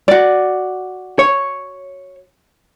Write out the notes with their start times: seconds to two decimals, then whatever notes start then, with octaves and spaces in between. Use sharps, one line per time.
0.08 F#4 D5
1.19 C#5